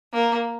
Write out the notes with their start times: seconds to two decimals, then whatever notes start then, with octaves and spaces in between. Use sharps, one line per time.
0.13 A#3